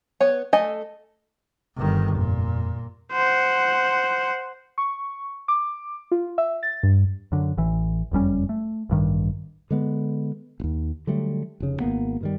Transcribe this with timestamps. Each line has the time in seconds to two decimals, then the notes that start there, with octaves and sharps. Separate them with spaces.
0.20 B3 C#5
0.53 A3 A4 D#5 G#5
1.77 G1 D#3
2.15 F2 A#2
3.12 C5 F#5
4.78 C#6
5.48 D6
6.12 F4
6.38 E5
6.63 A6
6.83 G2
7.32 F#2 D3
7.58 A1 E3
8.12 F#1 F2 G3 C#4
8.49 A3
8.90 A1 G2 D#3
9.71 D3 G#3 B3
10.60 E1 D#2
11.07 D3 F#3 G3 A3
11.60 F1 C#3
11.80 G#1 E2 A#3 B3
12.21 G2 D#3 G3